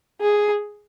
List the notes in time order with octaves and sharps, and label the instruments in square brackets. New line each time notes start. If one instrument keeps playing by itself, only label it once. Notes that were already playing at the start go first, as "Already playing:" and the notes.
[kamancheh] G#4